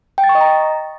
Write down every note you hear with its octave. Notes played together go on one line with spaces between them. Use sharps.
G5
A6
C#6
D#5
A#5